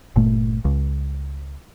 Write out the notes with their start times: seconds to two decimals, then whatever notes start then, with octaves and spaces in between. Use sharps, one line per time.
0.16 G1 A#2 A3
0.65 C#2